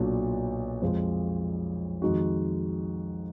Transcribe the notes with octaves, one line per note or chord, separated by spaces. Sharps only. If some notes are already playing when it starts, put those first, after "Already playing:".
Already playing: B1 A#2 F#3 D4 F#4
F2 F3 G#3
F2 D#3 G#3 D#4 F#4